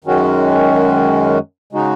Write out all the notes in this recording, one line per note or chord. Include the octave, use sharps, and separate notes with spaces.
F#2 D#3 G#3 C#4 F#4
C#3 G#3 D#4 F#4